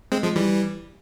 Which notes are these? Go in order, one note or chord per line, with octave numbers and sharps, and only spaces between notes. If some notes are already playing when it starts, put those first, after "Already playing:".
G#3 C4
F3 G#3
E3 G3